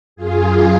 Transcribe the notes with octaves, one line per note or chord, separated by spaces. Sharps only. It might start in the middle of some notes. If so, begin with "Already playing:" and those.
F#2 F4 G#4